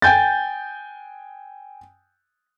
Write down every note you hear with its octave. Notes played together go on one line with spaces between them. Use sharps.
G5 G#5 G6 A6